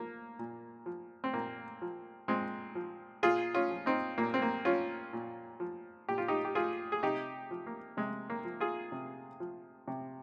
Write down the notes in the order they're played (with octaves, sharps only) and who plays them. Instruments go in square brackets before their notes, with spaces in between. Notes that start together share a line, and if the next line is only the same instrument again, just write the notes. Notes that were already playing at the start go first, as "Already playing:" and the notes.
Already playing: [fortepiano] F3 A#3
A#2
F3
C4
A#2 A#3
F3
A#2 G#3 C4
F3
A#2 F4 G#4
C#4 F4
F3
C4 D#4
A#2 A#3
C4
A#3
F3 C#4 F4
A#2
F3
A#2 G4
F4
D#4 G4
G4
F3 F4 G#4
G#4
C3 D#4 G4
F3
A#3
C3 G#3
A#3
F3
F4 G#4
C3
F3
C3